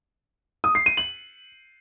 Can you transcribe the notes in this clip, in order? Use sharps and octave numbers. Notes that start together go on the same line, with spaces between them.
D#6
C7
D#7
F#7